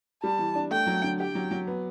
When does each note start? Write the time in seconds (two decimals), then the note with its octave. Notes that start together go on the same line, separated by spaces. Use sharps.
0.23 G3 A5
0.39 E3
0.55 D4
0.71 A3 G5
0.87 F#3
1.04 D3
1.20 G4 G5
1.35 F#3
1.51 F#3
1.67 B3